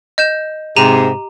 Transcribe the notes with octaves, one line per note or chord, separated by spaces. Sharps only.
D#5 G6 E7
G#2 C3 G4 A#5 D#7